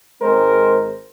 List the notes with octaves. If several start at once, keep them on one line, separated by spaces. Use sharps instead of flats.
G#1 G#3 C4 A#4 C5